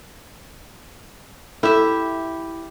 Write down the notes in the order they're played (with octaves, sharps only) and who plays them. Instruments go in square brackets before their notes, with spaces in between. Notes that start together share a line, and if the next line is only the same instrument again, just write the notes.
[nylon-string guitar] E4 [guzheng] G4 E5 [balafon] A4